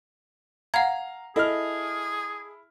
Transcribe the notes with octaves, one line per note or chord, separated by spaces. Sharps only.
F5 F#5 A#5 G#6
E4 G#4 A4 D#5 F6